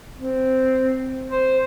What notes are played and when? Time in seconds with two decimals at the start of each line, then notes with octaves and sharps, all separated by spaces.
0.17 C4
1.30 C5